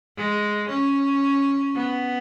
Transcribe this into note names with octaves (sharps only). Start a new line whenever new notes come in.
G#3
C#4
B3